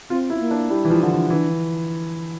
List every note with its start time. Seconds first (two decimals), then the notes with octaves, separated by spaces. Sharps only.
0.10 C4 F4
0.30 E4
0.35 C4
0.40 A#3
0.51 D4
0.70 G3 E4
0.85 E3
0.90 F3 E4
1.00 D3 D4
1.11 E3
1.30 E3 D4